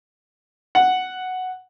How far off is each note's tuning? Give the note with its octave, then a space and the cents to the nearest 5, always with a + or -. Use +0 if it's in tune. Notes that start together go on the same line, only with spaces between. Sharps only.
F#5 +0